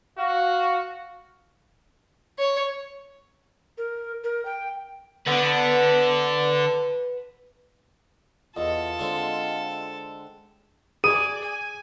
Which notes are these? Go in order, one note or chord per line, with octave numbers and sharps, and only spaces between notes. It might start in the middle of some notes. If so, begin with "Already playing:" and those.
F#4 F5
C#5
A#4
A#4
G5
D3 D4 B4 F#5
E2 F4 A4 D#5
D3 G#3 C4
G#4 D5 G#5 D#6 D#7
G#5